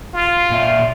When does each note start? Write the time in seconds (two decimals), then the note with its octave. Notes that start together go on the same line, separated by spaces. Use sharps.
0.14 F4
0.51 A#2 E5